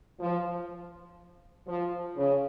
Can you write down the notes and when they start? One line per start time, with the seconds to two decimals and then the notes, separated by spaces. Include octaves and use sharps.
0.20 F3
1.67 F3
2.17 C#3